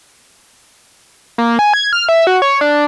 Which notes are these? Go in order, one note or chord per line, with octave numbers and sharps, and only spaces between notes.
A#3
G#5
G#6
F6
E5
F#4
C#5
D4